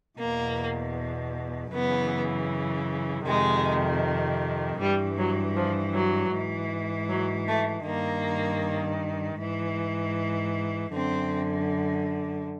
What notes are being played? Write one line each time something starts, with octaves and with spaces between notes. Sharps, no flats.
E2 B2 A#3
F#2 C#3 E3 B3
F2 C3 D#3 G#3
G2 E3 G3
F#3
F3
F#3
G#2 E3
F#3
A3
G2 D#3 A#3
G#2 E3
F#2 D3 C4